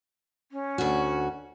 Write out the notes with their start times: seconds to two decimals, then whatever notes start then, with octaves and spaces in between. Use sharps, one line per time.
0.52 C#4
0.78 D2 F#4